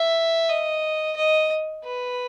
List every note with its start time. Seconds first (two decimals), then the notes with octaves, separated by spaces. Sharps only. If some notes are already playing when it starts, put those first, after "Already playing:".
Already playing: E5
0.49 D#5
1.16 D#5
1.84 B4